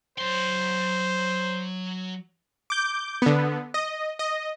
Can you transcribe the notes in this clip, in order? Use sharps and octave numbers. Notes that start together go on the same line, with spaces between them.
F#3 C5 C6
D6 G6
D3 B3
D#5
D#5